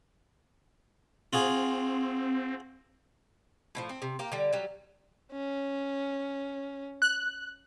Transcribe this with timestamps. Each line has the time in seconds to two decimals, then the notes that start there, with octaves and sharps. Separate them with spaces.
1.33 C4 F4 F#4 G#4
3.75 A2 D3 F3
3.89 C4
4.02 C3
4.19 A#3 G4
4.32 D3 G3
4.53 F#3 G3
5.32 C#4
7.02 F#6